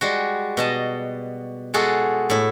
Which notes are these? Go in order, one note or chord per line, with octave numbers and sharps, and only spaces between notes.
G3 G#3 F#4
B2 D#5 A5
G#3 F4 F#4 G#4 A4
A2 E4